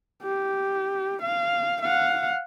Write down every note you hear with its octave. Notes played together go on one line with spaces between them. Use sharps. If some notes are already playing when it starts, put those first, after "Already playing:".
G4
F5
F5 F#5